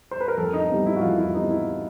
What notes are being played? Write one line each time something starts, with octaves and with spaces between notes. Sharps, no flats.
C5
B4
A#4
F2 A4
D#4
C3 E3 G3 B3
E4
F#4
F2 F4
E4
C3 E3 G3 B3 D#4
E4